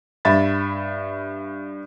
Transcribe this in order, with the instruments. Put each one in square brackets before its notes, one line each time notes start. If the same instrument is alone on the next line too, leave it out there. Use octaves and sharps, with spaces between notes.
[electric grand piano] G2 E5 B5 A6